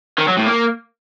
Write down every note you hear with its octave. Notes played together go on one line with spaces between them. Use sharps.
D#3
F#3
A2
A#3